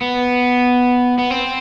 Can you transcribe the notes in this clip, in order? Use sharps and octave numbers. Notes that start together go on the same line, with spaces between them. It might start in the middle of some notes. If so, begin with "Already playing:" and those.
B3
B3
C4